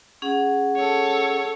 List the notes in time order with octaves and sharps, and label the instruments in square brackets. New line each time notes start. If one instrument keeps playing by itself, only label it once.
[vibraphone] C#4 G#4 F#5
[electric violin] A4 C#5